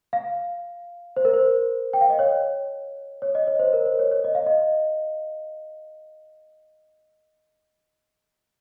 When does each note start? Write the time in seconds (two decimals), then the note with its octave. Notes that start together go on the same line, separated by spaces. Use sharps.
0.13 F5
1.17 C5
1.25 A#4
1.34 C5
1.93 G5
2.01 F5
2.10 D#5
2.19 C#5
3.22 C#5
3.35 D#5
3.47 C#5
3.59 C5
3.73 A#4
3.86 C5
3.99 C#5
4.11 C#5
4.24 D#5
4.35 F5
4.46 D#5